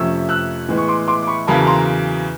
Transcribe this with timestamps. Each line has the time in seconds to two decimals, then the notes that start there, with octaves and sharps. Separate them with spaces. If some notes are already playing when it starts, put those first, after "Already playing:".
Already playing: F2 C3 F3 A3 C#4 E6
0.29 E6 F#6
0.69 A2 E3 G#3 B3
0.77 C#6
0.88 C6 D6
1.08 C6 D6
1.23 D6
1.27 B5 C#6
1.47 E2 C#3 F#3 A#3 A5 B5
1.67 A#5 C6